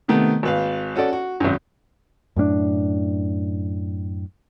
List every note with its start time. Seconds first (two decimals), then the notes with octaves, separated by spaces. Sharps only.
0.08 C3 D#3 A3 B3
0.43 G#1 B4 F5
0.96 C#4 F#4 A4 D5
1.13 F#4
1.40 G#1 F#2
2.36 F#2 A2 C#4 D4